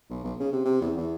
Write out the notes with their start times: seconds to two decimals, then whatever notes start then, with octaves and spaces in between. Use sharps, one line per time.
0.10 B1
0.24 B1
0.39 C#3
0.52 C3
0.65 C3
0.81 E2
0.97 E2